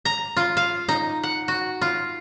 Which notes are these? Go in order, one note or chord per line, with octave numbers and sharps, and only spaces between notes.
A#5
F4
F5
D#4
F#5
F#4
F4